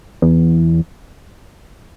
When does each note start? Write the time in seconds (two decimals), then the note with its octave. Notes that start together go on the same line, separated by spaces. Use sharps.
0.22 E2